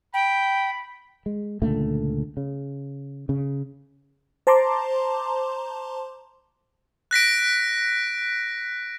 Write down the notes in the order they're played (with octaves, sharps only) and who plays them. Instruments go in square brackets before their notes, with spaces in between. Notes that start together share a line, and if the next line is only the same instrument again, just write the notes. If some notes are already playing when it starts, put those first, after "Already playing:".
[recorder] G5 [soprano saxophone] B5
[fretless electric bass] G#3
C#2 A#2 D3 A3
C#3
C#3
[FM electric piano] C5 A5 A#5 C6 D6
[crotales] F#6 A#6 B6 D7